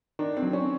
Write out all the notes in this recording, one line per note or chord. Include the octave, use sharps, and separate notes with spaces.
D#3 D4
C4
F#3
C#4